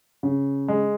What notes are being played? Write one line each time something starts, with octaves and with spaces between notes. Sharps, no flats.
C#3
G#3